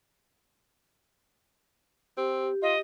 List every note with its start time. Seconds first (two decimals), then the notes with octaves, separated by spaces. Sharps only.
2.17 C4 G4
2.62 F4 D#5